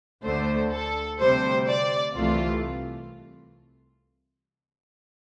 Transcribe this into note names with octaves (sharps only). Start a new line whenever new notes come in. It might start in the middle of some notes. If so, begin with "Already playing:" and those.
D2 D3 A3 C5
A4
D2 C3 G3 C5
D5
C2 C3 E3 A3 F4